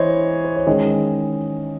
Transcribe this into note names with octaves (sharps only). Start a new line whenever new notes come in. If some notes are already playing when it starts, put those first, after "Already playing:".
Already playing: E3 C5 C#5 D#5
C5
C#5
D#3 G#3 C#4 D#5